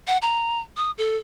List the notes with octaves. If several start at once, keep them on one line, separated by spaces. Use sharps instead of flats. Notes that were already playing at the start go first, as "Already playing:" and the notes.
F#5
A#5
D#6
A4